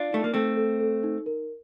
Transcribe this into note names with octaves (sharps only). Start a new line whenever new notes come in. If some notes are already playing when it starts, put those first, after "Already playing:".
Already playing: D4 F4
A3 D#4
A#3
A3 C4 A4
A4
A4
D#4
A#4